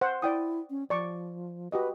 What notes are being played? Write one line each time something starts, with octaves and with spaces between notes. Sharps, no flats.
C5 F#5
E4 D5 G5 D#6
C#4
F3 D5 C#6 D6
F#4 G4 B4 D#5